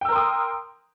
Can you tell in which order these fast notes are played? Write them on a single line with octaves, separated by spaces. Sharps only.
G5 E6 A#4 C6 D#6